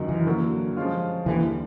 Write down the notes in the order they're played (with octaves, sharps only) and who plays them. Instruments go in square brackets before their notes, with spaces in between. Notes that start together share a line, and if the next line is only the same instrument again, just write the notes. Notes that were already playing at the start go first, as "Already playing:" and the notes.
Already playing: [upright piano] F#2 D#3 F#3
[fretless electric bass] E3
[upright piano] D3 F#3 A#3
F3 G#3 C#4 F4
[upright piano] D#2 D3 G3 [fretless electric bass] E3